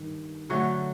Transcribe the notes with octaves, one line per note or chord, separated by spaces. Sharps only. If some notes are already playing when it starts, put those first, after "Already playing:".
Already playing: G2 D#3
D3 F#3 A3 C#5